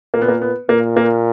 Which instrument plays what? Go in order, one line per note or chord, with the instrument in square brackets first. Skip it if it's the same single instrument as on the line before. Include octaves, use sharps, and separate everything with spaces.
[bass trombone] A#2 [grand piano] A#3
[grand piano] B3
A#3
B3
[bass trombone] A#2 [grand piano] A#3
[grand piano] A#3